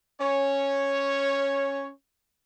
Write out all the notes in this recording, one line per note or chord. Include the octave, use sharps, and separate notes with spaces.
C#4 C#5